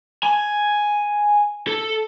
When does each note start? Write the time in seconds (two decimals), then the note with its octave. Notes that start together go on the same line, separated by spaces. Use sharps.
0.23 G#5
1.67 A4